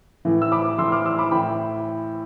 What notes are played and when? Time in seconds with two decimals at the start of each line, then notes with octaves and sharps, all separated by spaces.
0.25 A2 E3
0.42 E6
0.52 B5 D6
0.78 A2 E3 C6 E6
0.92 D6 F6
1.05 C6 E6
1.19 B5 D6
1.31 A2 E3 G5 B5